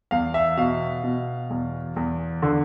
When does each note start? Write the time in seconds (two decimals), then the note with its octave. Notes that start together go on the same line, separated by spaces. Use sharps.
0.11 E2 F5
0.34 E5
0.57 B2 F5
1.04 B2
1.50 E2
1.96 E2
2.42 D3